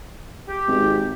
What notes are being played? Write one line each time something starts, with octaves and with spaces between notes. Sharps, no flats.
G4
G#1